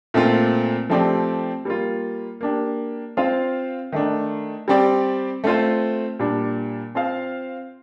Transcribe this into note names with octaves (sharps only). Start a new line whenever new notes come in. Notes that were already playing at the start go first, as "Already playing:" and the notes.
A#2 A3 C4 F4
F3 A3 C4 G4 D5
G3 A#3 F4
A#3 D4 G4
C4 F4 C5 F5
D#3 A3 D4
G3 C4 G4 D5
A3 C4 F4 C5
A#2 G3 D4
C4 F4 C5 F5